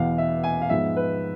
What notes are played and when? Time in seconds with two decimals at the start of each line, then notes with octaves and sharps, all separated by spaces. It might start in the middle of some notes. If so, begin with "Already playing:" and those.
Already playing: E2 B2 B3 F5
0.18 E5
0.44 G#5
0.62 F5
0.70 G#2 F3 G#3 B3 E5
0.96 B4